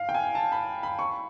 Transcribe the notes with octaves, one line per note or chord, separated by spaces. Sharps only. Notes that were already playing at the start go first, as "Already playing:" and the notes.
Already playing: F5
G5
G#5
A5
B5
B5
C#6